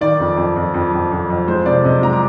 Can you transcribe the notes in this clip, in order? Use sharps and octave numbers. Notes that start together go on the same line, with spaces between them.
D#3 D5
F2
F2
F2
F2
F2
F2
F2
G#3 C5
C3 D5
C3 D#5
G#3 A#5
D6